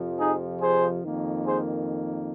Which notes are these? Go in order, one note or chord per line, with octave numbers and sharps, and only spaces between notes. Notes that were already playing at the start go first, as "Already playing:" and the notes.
Already playing: F2 C3 F3
D#4 G#4
G#4 C5
F2 D#3 A#3
G#4 C5